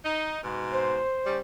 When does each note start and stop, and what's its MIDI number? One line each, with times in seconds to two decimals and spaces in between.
0.05 0.39 63
0.43 1.01 44
0.43 1.01 47
0.72 1.38 72
1.26 1.38 49
1.26 1.38 55